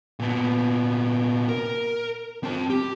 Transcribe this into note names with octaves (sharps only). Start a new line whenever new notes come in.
A#2 B3
A#4
C4 A5
G4